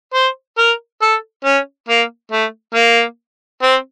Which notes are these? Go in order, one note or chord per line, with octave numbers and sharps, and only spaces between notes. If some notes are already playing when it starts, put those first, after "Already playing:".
C5
A#4
A4
C#4
A#3
A3
A#3
C4